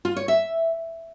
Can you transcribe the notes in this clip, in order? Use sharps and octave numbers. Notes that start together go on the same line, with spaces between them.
F4
C#5
E5